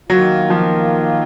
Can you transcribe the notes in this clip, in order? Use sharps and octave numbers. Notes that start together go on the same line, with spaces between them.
D#3 F#3 A#3 F4
F3